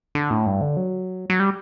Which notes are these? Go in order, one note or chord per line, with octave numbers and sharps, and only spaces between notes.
D3
A2
G2
D3
F#3
F#3
G3